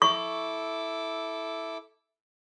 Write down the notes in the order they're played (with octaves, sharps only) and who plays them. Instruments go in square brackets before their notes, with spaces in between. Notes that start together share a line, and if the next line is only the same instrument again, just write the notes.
[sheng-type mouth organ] E4 A4 D6 [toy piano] C#6